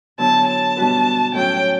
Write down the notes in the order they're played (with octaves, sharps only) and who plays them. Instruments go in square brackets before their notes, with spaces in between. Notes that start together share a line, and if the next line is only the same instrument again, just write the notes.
[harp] D3 F#3 B3 E4 [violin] A5
[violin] A5
[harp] B2 G3 D4 F#4 B4
[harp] A2 F#3 C#4 F#4 A4 [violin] G5